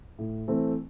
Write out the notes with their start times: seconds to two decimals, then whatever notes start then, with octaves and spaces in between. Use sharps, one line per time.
0.19 A2
0.48 E3 A3 C4